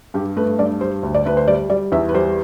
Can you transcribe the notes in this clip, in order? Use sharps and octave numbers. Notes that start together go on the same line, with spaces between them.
G2 G4
A3 B4
G2 D5
G3 C5
D2
D5
D2 B4
C5
G3 D5
G3 D5
E2 E5
B4
G3 C5